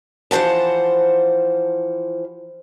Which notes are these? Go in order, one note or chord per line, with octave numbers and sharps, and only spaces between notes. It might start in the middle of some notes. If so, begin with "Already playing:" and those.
E3 F3 C5 F#5 A5